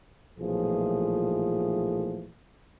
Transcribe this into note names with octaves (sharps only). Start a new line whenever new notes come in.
B1 A#2 E3 F3 A3 G#4